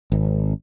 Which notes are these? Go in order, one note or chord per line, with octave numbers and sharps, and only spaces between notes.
G#1